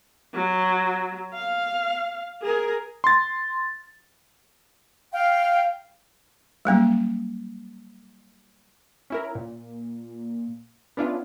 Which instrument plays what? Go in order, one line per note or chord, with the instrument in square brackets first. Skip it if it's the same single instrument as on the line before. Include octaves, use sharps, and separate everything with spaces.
[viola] F#3
F5
G#4 A#4
[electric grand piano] C6 A6
[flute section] F5 G5
[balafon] F#3 G3 A#3 C#4
[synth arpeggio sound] C#4 E4 A#4
A#2
B3 C#4 D4 E4 F4